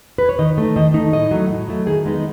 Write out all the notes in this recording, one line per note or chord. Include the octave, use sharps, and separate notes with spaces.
B4
C#5
D#3 D#5
A3 D#4
D#3 D#5
A3 D#4
A2 D#5
F#3 A3
A2
F#3 A3
D#3 G#4
G#3 B3 D#4